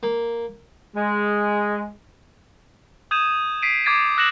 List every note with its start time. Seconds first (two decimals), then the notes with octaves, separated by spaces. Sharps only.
0.03 A#3
0.96 G#3
3.11 D#6 G6 G#6 D#7 E7
3.62 B6 C7 D7 D#7
3.84 D6 G#6 A6 C7 D7 D#7
4.17 E6 F#6 A#6 C#7 E7 F#7